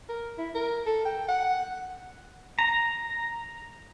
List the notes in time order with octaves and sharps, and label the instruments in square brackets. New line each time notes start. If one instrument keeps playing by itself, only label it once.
[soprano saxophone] A#4
E4
A#4
A4
G5
F#5
[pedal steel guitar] A#5